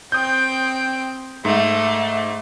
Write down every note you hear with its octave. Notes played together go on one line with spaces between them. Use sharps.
C4 G5 D#6 G6
G#2 A3